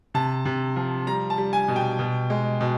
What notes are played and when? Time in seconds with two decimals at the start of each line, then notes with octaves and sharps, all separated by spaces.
0.14 C3 A5
0.45 C3
0.76 F3
1.07 G3 A#5
1.30 A5
1.38 G3
1.53 G#5
1.68 B2
1.76 G5
1.99 B2
2.30 G#3
2.61 B2